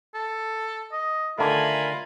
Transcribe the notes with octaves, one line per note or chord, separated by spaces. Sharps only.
A4
D#5
D3 D#3 A3 F4 A#4 G#5 B5